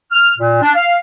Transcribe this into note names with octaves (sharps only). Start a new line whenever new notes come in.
F6
A#2
D4
F5